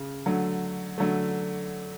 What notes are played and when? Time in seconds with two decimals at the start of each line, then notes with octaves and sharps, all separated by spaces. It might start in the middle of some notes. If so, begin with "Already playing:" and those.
Already playing: C#3
0.26 D3 F#3 A3
0.98 D3 F#3 A3